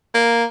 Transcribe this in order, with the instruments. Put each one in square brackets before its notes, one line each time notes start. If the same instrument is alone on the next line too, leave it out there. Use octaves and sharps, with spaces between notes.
[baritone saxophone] A#3